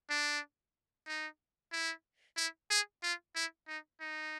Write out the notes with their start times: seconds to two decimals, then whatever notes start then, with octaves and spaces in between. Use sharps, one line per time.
0.10 D4
1.08 D#4
1.73 E4
2.37 E4
2.71 G#4
3.03 F4
3.35 E4
3.68 D#4
4.01 D#4